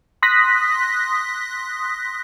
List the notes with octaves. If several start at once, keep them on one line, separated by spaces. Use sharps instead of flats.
C6 D#6 F#6 A#6 B6